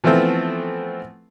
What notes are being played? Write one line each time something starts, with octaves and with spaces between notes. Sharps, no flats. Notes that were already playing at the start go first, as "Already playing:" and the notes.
E3 F3 A3 B3 C4